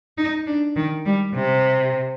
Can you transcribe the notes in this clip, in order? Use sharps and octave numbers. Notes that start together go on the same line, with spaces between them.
D#4
D4
D#3
G3
C3